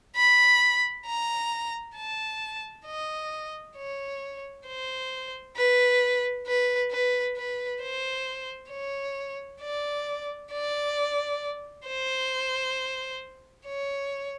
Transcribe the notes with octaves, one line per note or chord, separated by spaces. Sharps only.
B5
A#5
A5
D#5
C#5
C5
B4
B4
B4
B4
C5
C#5
D5
D5
C5
C#5